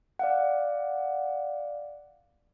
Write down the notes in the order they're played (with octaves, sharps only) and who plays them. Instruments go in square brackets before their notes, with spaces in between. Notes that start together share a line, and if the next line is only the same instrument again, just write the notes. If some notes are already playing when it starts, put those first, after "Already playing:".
[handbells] D5 F5 F#5